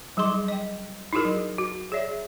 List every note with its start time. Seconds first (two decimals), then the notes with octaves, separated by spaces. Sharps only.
0.17 F#3 G3 D#4 G#4 C6 D6
0.48 D#5 G5
1.13 D#4 E4 F#4 G#4 A#4
1.25 F#3
1.58 F#4
1.92 G#4 C#5 D5 E5